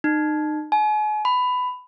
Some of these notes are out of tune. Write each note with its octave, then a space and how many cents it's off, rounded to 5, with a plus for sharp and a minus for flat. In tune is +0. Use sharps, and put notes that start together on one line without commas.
D#4 -30
G#5 +40
B5 +15